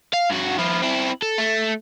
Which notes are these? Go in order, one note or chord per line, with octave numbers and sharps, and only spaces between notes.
F5
G2 F#4
F3 E4
C4 E4
A4
A3